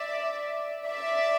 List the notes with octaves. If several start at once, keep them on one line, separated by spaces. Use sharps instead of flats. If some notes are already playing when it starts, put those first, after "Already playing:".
Already playing: D5 E5
D5 E5